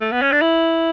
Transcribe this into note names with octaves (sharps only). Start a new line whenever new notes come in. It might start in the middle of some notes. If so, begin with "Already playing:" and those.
A3
B3
C#4
D4
E4